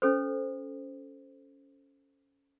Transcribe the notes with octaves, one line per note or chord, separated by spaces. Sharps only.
C#4 A4 C5